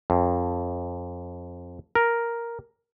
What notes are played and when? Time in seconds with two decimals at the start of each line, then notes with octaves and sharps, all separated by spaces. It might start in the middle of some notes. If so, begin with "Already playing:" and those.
0.10 F2
1.95 A#4